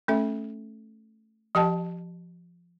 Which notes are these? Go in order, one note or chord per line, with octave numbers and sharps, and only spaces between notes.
A3 C#4 A4 E5
F3 G4 D#5 G5 A5